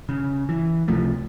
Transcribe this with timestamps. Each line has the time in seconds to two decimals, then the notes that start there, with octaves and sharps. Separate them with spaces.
0.09 C#3
0.49 E3
0.88 C#2 C3 F3 A3